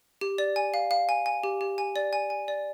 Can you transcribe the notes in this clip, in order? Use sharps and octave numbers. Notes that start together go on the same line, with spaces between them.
G4
D5
G#5
F5
F5
G#5
G#5
G4
G4
G#5
D5
G#5
G#5
D5